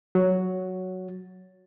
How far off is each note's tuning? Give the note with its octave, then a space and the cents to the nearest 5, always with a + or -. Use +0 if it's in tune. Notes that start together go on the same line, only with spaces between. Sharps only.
F#3 +0 F#4 +0 C#5 +10